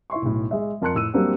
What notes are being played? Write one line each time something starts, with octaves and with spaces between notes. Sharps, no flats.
E4 E5 C6 C#6
B1 A2
G#3 E5
F2 A#4 A5 C6 F#6 C#7
A2 E6 D#7
F#3 G3 A#3 C4 D4 G4